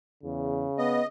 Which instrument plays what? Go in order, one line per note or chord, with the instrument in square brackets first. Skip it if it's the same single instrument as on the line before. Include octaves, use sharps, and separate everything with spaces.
[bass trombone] E2 [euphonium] C#3
[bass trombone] B3 [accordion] D#5